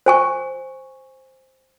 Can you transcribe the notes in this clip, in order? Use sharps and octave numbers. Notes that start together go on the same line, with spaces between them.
C5 G#5 C#6